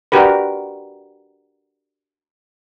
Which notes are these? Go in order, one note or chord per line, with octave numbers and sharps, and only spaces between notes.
D4 F#4 G4 A#4 B4